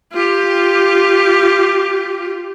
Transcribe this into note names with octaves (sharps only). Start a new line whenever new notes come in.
F4 G4